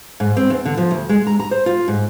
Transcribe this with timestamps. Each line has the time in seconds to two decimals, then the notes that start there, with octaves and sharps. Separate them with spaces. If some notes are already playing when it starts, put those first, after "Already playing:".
0.20 G#2
0.37 C4
0.50 E2
0.65 D3
0.77 F3
0.91 D2
1.09 G#3
1.27 A#5
1.40 A#5
1.51 C5
1.66 F4
1.88 G#2